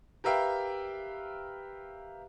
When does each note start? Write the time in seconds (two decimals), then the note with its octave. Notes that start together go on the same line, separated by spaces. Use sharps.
0.24 G4 A#4 B4 E5 F5 G5